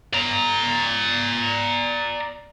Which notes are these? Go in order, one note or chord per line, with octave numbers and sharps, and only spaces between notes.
D5 A#5